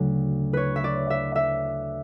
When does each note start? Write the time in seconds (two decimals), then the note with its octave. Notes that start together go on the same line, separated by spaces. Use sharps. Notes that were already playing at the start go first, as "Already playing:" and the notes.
Already playing: D2 C#3 F#3 A3
0.53 B4 C#5
0.76 E5
0.84 D5
1.10 E5
1.36 E5